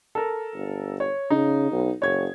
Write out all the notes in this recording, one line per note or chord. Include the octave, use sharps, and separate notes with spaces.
A4 A#4
G1
C#5
C#3 D#4
B1
F#1 C#5 G#6